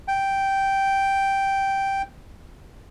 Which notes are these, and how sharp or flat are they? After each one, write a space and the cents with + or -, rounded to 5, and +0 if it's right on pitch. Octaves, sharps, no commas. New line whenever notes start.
G5 -5